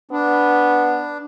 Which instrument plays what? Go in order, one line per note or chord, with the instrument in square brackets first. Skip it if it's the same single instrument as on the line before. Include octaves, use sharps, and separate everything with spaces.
[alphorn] B3 [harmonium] D4